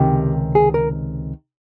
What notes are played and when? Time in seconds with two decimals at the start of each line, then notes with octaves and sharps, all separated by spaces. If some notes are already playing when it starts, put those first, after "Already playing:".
Already playing: C#2 C3 D#3 G4
0.55 G#4
0.74 A#4